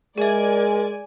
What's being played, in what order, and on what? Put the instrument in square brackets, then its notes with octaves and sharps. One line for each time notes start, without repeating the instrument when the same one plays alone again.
[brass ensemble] G#3 [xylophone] G#4 E5 [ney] A#4 [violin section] D5 G#5